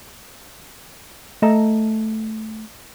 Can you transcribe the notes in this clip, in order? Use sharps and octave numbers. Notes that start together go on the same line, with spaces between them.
A3 A4 D#5 A5 A#5